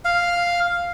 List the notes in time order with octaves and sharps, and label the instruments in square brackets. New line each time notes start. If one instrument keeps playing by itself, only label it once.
[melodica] F5